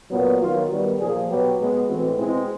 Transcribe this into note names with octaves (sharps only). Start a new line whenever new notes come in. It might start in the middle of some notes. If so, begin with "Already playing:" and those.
A#2 F#3 B3
D#3 F#3 B3 F4
D#3 G3 B3 F#4
A#2 F3 A#3 G#4
B2 F#3 B3 G4
B2 G#3 B3
A2 E3 G#3 C4 F#4
B2 G#3 C4 E4